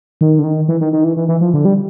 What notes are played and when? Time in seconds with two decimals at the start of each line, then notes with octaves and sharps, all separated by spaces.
0.21 D#3
0.39 D3
0.44 D#3
0.68 E3
0.81 D#3
0.93 D#3
1.04 E3
1.17 E3
1.28 E3
1.41 F3
1.54 D3
1.65 G3